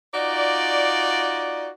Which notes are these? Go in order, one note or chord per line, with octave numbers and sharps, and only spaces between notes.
D#4 F4 F#4 D5